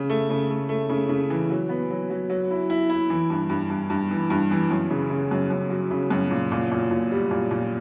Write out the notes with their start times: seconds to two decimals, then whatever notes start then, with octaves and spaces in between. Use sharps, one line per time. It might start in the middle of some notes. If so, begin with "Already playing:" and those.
Already playing: C#3
0.10 A3
0.30 C#3
0.50 A3
0.69 A3
0.90 C#3
1.09 C#3
1.30 E3
1.50 F#3
1.69 B3
1.90 F#3
2.10 F#3
2.30 F#3
2.51 E4
2.70 E4
2.90 E4
3.10 E3
3.30 G2
3.50 G2
3.70 G2
3.90 G2
4.11 E3
4.30 G2
4.51 E3
4.70 F#2
4.91 C#3
5.10 C#3
5.31 F#2
5.50 F#2
5.70 F#3
5.91 C#3
6.10 F#2
6.31 A#2
6.52 A#2
6.71 A#2
6.91 A#2
7.11 G3
7.31 A#2
7.51 A#2